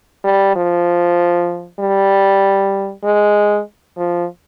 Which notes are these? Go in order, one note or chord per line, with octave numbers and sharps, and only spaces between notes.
G3
F3
G3
G#3
F3